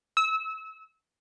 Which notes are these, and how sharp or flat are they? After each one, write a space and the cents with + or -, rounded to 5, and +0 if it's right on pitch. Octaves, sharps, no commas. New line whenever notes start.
E6 -30